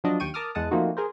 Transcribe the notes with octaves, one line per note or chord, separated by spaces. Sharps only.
F3 F#3 D4 D#5
D#2 G5 C#6 D#7
A#4 A5 D6 D#6 F6
E2 G#3 F#5 A5 D#6
F3 A3 A#3 C4 D#4 F#4
G#4 A#4 C5